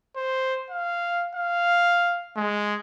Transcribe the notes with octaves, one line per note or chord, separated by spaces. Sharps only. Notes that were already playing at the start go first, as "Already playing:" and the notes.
C5
F5
F5
G#3